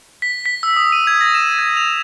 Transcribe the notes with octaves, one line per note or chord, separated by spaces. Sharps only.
B6
B6
E6
D#6
D#7
G#6
A#6
E7
G#6
F7